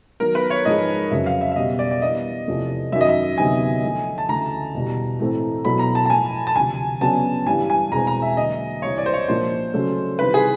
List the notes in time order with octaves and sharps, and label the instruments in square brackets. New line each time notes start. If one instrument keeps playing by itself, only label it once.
[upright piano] D#3 F#3 B3 [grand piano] A#4
[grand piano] B4
C#5
[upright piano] G#2 F3 G#3 [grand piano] D#5
[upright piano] F2 C#3 F#3 [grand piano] E5
[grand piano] F5
E5
E5
[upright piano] B2 G3 B3 [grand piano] D#5
[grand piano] D5
D5
[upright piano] E3 G3 B3 D4 [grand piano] D#5
[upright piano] E2 C3 F3 A3
[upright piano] F#2 D#3 F#3 [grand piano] E5
[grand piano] D#5
E5
[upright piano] D2 C3 D#3 F#3 B3 [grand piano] G#5
[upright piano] D3 F3 A3
[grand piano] A5
[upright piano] D2 C#3 E3 A3 [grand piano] A#5
[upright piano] E2 B2 G3
A2 E3 A3 C4
[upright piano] B2 F#3 B3 E4 A4 [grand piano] B5
[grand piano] A#5
A5
A5
[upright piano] A2 F3 A3 [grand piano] G#5
[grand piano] A5
[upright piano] D2 C3 F3 [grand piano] G#5
[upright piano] C#3 F#3 B3 D4 F#4 [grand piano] A5
[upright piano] G2 E3 G3 [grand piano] G#5
[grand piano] G#5
[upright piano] E2 B2 G#3 C4 [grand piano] A#5
[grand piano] A#5
E5
[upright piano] D3 F#3 A#3 D4 [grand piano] D#5
[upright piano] C2 C3 E3 [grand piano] C#5
[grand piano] D5
C5
C#5
[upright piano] A#2 F3 A#3 D4 [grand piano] C5
[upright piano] C#3 F#3 A3 C#4
[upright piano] C3 D#3 G3 C4 E4 [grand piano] B4
[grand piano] G#4